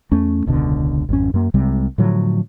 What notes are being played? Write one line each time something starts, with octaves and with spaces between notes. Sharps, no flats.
E2 A3 C#4
E1 C#2 B2 D3
G#1 F2 C#4
F#2 A#3
C2 C3 G3 G#3
A2 D3 F3 F#3